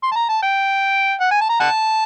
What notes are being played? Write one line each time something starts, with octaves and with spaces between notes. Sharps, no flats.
C6
A5
A#5
A5
G5
F#5
G#5
A5
A#5
F#5 A5